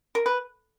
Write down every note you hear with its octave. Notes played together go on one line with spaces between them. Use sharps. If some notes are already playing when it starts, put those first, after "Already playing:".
A#4
B4